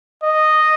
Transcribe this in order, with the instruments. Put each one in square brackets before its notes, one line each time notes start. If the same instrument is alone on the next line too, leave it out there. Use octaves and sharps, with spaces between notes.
[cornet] D#5